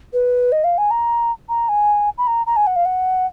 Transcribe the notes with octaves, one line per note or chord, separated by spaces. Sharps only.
B4
D#5
F5
G#5
A#5
A#5
G#5
B5
A#5
A#5
G#5
F#5
F5
F#5